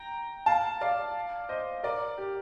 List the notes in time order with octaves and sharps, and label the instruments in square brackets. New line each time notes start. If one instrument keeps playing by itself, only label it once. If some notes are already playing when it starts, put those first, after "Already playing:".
Already playing: [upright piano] G5 A#5
F5 A5
D5 F5
C5 D#5
A#4 D5
G4 A#4